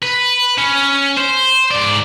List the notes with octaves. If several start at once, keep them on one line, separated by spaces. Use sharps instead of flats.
B4
C#4
C5
G#2 D5